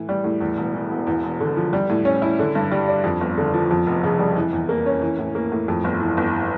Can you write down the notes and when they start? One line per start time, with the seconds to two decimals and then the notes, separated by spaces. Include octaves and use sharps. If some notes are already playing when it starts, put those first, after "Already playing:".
Already playing: A2 E3
0.09 G3
0.24 A2
0.40 E2
0.57 E1
0.75 E3
0.90 E1
1.07 E2
1.23 E1
1.40 D3
1.56 F3
1.73 G3
1.90 A2
2.05 C#4
2.22 E4
2.39 D3
2.55 G2
2.72 G3
2.88 D4
3.04 F2
3.21 G1
3.37 D3
3.54 F3
3.71 F2
3.87 F1
4.04 C#3
4.19 G3
4.36 E3
4.53 E2
4.69 A#3
4.86 C#4
5.01 E3
5.19 A2
5.35 A#3
5.52 A2
5.68 F2
5.84 G1
6.00 E3
6.17 G1